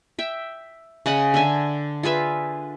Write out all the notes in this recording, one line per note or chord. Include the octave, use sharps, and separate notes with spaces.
E5 G5
C#3 D#5 F#5 B5
D3 E5 G#5
F4 G#4 B4 E5